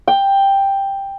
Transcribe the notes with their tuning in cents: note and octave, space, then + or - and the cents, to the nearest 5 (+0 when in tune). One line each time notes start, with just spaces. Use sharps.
G5 +5